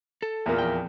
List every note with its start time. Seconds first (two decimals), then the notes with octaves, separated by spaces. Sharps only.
0.22 A4
0.46 E2 A#2 A#3
0.58 F2 G5